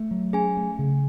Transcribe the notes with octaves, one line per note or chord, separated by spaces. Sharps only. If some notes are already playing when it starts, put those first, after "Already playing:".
Already playing: A3
F#3
C#4 G#4 G#5
A3
C#3